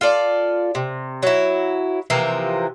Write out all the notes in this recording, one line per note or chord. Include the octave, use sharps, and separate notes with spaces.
F4 A4 D5
C3
F#3 E4
C3 E3 F3 A#3